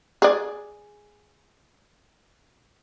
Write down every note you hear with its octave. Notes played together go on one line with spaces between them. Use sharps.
G#4 D5